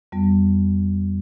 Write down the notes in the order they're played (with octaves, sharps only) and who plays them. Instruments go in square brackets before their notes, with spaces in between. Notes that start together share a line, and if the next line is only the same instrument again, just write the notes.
[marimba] F2 G3 B3